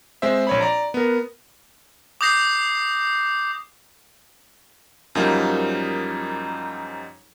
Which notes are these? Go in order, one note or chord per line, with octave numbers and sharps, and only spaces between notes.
G#3 C4 C5 E5
A#1 C#5 B5
D5 A#5
B3 A#4
D6 D#6 G6 A#6 C7
F#2 F3 G3 A#3 D#4